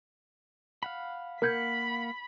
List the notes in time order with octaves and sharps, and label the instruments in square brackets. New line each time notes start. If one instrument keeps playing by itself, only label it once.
[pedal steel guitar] F5 F#5 B5
[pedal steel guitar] A#3 F5 F#5 [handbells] A#4 G6 G#6 [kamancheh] B5